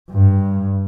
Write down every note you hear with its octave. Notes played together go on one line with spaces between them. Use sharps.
G2